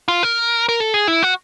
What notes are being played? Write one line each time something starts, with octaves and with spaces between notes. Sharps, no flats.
F4
A#4
A#4
A4
G#4
E4
F#4